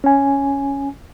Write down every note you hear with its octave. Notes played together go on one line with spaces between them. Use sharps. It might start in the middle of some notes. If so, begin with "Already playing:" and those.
C#4 G#5